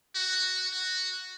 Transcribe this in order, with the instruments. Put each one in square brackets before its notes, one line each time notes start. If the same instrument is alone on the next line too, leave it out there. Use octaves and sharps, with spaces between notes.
[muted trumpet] F#4
F#4